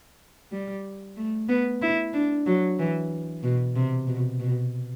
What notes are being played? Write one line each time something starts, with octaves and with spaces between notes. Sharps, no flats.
G3
A3
B3
E4
D4
F#3
E3
B2
C3
B2
B2